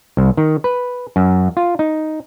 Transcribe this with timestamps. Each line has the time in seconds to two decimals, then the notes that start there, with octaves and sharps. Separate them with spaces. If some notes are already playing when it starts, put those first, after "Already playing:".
0.17 C2
0.37 D#3
0.64 B4
1.16 F#2
1.57 F4
1.79 D#4